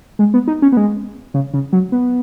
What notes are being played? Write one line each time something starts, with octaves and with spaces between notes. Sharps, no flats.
G#3
B3
D#4
C#4
B3
G#3
C#3
C#3
F#3
B3